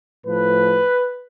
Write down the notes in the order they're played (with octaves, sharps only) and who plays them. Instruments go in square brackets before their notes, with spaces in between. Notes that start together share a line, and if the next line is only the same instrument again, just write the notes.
[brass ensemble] A2 F3 B4